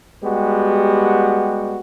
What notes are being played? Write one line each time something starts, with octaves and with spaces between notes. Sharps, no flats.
G3 G#3 B3 F#4 G4